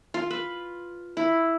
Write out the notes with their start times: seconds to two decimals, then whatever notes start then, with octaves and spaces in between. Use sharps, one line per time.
0.14 F4
0.31 B4
1.17 E4